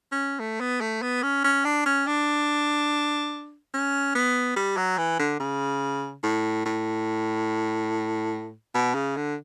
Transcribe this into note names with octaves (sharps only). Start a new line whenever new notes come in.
C#4
A3
B3
A3
B3
C#4
C#4
D4
C#4
D4
C#4
B3
G3
F#3
E3
D3
C#3
A2
A2
B2
C#3
D3